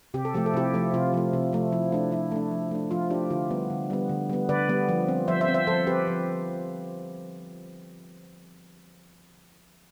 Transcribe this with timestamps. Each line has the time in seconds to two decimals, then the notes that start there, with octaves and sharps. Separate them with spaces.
0.14 C3 G4
0.25 A4
0.34 F3 A3 G4
0.46 A4
0.53 C3 E4 G4
0.74 F3 A3
0.94 C3 F4
1.13 F3 A3
1.33 C3
1.53 F3 A3
1.72 F3 E4
1.92 A3 D4 E4
2.11 F3 E4
2.32 A3 D4
2.51 F3
2.71 A3 D4
2.91 F3 F4
3.10 A3 D4 E4 G4
3.31 D3 F4
3.51 G3 B3
3.70 D3
3.90 G3 B3
4.09 D3
4.30 G3 B3
4.49 D3 B4 D5
4.69 G3 B3
4.89 F3
5.08 C4
5.28 F3 C5 E5
5.41 C5 E5
5.48 C4
5.54 C5 E5
5.67 F3 A4 C5
5.87 C4 G4 B4
6.07 F3